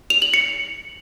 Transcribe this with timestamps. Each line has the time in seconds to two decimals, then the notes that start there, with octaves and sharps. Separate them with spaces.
0.10 F7
0.22 F#7
0.34 C#7